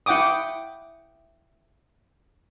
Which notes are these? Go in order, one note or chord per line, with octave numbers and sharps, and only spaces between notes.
E4 F#5 G5 D6 D#6